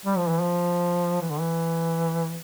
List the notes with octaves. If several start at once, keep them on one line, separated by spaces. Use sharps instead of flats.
G3
F3
E3
F3
E3
D3
E3